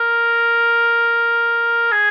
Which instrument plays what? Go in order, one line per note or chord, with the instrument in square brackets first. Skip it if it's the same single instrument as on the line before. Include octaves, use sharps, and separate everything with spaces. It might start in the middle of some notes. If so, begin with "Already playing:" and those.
Already playing: [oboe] A#4
G#4